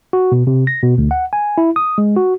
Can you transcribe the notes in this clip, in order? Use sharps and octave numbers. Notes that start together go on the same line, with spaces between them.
F#4
B2
C3
A#6
B2
D2
F#5
G#5
E4
D#6
G#3
F#4